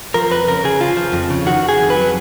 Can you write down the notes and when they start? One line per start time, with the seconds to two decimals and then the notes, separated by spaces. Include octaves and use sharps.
0.14 F3 A#4
0.31 F2 B4
0.47 C#3 A#4
0.64 C#3 G#4
0.80 F3 F4
0.97 F3
1.13 F2
1.30 C#3
1.46 D#3 F#4
1.62 D#3
1.69 G#4
1.79 F2
1.90 B4
1.96 F#3